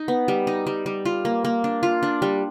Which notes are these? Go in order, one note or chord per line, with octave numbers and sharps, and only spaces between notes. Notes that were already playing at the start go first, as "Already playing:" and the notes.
Already playing: D#4
B3
G3
D#4
G3
G3
F4
A#3
A#3
D4
F4
D4
G3